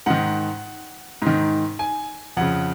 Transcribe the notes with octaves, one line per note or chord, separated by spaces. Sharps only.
G#2 D#3 F#5
G#2 D#3
G#5
F2 C#3 F#5